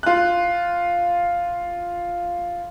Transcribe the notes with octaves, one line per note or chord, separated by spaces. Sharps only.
F4 F#6